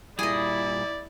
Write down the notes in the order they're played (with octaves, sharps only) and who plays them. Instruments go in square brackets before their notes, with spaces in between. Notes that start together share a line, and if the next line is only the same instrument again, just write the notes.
[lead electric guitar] A#2 G3 [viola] E4 [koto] G#4 D#5 [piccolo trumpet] D5